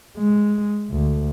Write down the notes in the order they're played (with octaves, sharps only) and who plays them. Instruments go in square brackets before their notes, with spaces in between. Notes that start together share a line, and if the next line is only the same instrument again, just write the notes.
[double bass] G#3
D2